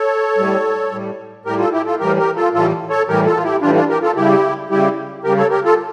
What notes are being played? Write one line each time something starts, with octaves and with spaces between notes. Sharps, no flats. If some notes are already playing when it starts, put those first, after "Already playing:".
Already playing: A4 C#5
A2 G3
A2 G3
A2 G3 G4 A#4
F4 A4
E4 G4
F4 A4
A2 E3 G3 G4 A#4
G4 A#4
F4 A4
A2 E3 G3 F4 A4
A4 C#5
A2 E3 G3 G4 A#4
F4 A4
F4
E4 G4
A2 E3 G3 D4 F4
D4 F4
G4 A#4
F4 A4
C#3 G3 E4 G4
C#3 G3 E4 G4
C#3 G3 G4 A#4
A4 C#5
G4 A#4
F4 A4